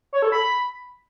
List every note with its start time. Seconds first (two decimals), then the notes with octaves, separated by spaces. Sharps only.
0.13 C#5
0.22 A4
0.32 B5